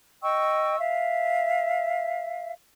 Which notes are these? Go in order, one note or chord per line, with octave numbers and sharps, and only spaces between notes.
D#5 G5 C#6 E6
E5 F5